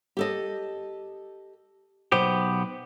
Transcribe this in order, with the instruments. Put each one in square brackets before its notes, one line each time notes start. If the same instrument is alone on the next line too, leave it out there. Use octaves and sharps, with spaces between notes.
[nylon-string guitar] G4 A4 D#5
[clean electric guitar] B1 B3 G4 [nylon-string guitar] C5